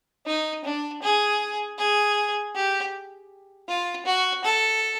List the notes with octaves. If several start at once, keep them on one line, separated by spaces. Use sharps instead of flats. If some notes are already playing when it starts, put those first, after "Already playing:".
D#4
D4
G#4
G#4
G4
F4
F#4
A4